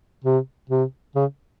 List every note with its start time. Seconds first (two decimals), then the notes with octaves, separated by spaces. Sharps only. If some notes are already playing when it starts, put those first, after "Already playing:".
0.24 C3
0.69 C3
1.16 C#3